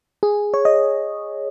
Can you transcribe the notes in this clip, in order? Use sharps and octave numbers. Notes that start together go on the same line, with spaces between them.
G#4
C#5
D#5